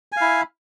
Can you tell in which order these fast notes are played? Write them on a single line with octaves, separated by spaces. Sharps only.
G#5 F5 E4